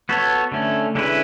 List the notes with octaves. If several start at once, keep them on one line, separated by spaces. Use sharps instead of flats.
B3 F#4 A4 C#5
D3 A3 C#4
D3 G#3 C#4 E4 B4